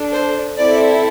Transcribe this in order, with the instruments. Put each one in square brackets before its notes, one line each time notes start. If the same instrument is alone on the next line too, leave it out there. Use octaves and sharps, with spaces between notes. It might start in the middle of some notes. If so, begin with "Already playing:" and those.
Already playing: [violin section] D4 A4
C5
C4 E4 A4 D5